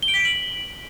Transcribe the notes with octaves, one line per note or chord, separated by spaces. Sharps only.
G7
D7
B6
D7
F#7